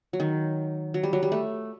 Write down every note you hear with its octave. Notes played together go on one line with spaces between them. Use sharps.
F#3
D#3
F#3
G3
F#3
G3
A3